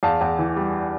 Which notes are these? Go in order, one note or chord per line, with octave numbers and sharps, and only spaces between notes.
E2 F5 A5
E2
E3
G3